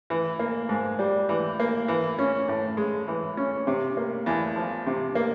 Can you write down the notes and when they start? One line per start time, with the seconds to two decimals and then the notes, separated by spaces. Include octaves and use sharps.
0.10 E3
0.39 A#3
0.69 G#2
0.99 G3
1.29 E3
1.59 A#3
1.88 E3
2.19 C#4
2.48 A2
2.77 G#3
3.08 E3
3.37 C#4
3.67 C3
3.97 A#3
4.26 E2
4.56 F3
4.86 C3
5.15 A#3